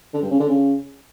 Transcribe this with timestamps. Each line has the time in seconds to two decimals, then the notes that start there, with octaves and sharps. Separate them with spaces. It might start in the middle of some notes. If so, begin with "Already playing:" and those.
0.14 D3
0.22 G2
0.31 C#3
0.40 D3
0.49 C#3